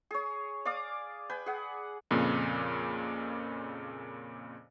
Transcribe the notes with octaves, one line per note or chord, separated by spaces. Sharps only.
G#4 C#5
D5 F5 D6 D#6
B4 G5 G#5
G#4 F#5
F2 A#2 C#3